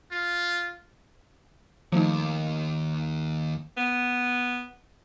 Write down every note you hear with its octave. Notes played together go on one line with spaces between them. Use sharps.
F4
D#2 F3 A3 D#4
B3